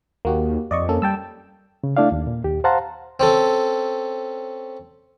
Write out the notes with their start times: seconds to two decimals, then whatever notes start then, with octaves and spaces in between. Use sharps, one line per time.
0.25 D#2 A#3 F#4 G4
0.71 F2 D5 D#5 C#6
0.89 A#3 C#4 A4
1.02 G3 G5 A5 E6
1.84 C#3
1.97 A3 D4 E4 D5 F5
2.12 D#2
2.27 A#2
2.44 D#2 G4
2.64 C5 F5 F#5 A5 A#5 C6
3.20 C4 C#4 A4